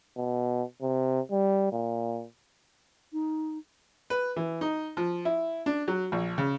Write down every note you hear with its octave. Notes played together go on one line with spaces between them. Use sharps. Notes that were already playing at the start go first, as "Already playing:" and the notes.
B2
C3
G3
A#2
D#4
B4
E3
D#4
F3
E4
D4
F#3
A#1
C#3